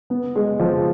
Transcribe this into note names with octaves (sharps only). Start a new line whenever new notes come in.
B3
G#3
F3